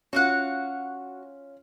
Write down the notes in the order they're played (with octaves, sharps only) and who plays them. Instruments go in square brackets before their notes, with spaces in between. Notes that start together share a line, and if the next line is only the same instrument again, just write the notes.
[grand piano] C#4 F4 [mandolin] F#4 F5 F#5